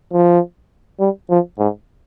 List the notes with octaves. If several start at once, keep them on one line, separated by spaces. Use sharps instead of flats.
F3
G3
F3
G#2